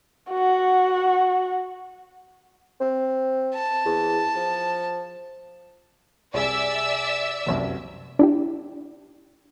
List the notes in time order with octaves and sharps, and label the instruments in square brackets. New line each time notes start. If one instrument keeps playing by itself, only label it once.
[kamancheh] F#4 F#5
[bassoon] C4
[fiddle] A5
[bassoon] E2
F3
[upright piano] C2 G#4 G#5 [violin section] D5 E5 E6
[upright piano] F1 C2 F#2
[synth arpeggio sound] D4 E4 G4